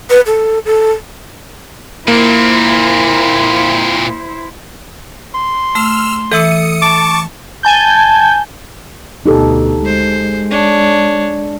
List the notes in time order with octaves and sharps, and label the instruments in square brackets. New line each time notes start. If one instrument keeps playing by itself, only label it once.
[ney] B4
A4
A4
[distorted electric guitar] A#2 C4 [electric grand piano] A#3 [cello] E4 C5
[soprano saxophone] C6
[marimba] A3 [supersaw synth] E6 F6
[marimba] E3 [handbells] A4 E5 E6 [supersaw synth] D#6 C#7
[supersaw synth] A5 C#6 [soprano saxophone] D6
[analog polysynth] G#5 A5 G6
[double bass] D2 B2 [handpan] D#4 G4 A4
[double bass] G#3 [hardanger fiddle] C5
[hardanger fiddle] D4 C#5